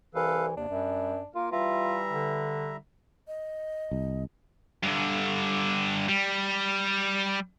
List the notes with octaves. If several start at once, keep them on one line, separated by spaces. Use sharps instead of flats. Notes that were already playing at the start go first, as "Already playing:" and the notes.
C2 E3 A4 B4 F5
D#2 C3 D4
F#2 G3
A#3 F4 A#4
E3 G3 F4 E5 A#5
D3
D#5
C2
G2 D3
G3